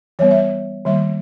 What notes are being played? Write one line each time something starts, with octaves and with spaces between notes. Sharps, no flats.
E3 G3 B3 C#5
E5
D#3 G3 A#3 E5